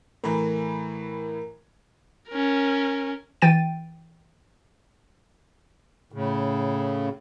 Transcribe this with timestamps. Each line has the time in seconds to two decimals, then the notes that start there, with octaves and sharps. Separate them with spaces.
0.24 A2 E3 A#4 A#5 B5
2.29 C#4 A#4
3.42 E3 G5 A6 D#7
6.12 A2 C#3